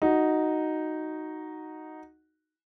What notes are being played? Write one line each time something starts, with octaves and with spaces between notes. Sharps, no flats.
D#4 F#4